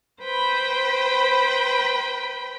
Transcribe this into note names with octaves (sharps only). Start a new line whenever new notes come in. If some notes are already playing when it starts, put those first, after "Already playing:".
B4 C5 G5 B5